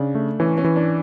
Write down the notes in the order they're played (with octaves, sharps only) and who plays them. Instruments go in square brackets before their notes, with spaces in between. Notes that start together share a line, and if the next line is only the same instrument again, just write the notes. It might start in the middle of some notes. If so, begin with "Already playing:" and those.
Already playing: [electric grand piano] C#3 [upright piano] D4
[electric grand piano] A3
[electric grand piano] E3 [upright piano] C#4
[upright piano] C#4
[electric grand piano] E3
[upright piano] D4